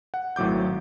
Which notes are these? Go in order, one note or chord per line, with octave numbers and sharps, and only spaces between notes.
F#5
G#1 A2 F#3 D6 G6